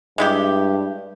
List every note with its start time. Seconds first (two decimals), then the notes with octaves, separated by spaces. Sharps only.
0.18 G2 G#3 E4 G4